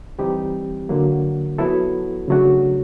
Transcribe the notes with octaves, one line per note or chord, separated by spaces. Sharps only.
E3 G3 C4 D#4 G4
D3 F#3 A#3
F#3 B3 E4 A4
C#3 F#3 A3 D4 F#4